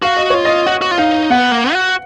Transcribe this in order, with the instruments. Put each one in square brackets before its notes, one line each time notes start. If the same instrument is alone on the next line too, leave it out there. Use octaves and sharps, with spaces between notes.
[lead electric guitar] F#4 [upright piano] F5
[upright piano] D#5
[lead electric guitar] F4 [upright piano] C#5
[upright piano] D#5
[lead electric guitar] F#4 [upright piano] D#5
[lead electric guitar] F#4
F4
[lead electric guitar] D#4 [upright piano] F5
[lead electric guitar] B3 [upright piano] F#5
[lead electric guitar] A#3
F#4